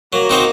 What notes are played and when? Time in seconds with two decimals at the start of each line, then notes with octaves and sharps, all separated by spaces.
0.13 F#3 A#3
0.29 C4 D#4 F#4 C5